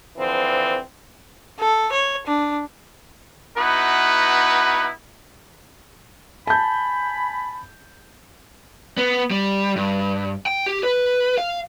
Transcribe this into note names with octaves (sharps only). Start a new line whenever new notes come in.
D3 E3 F3 C4
A4
C#5
D4
B3 D#4 E4 F#4 B4
G#5 A5 B5 G6
B3
G3
G2
G5
G4
B4
F5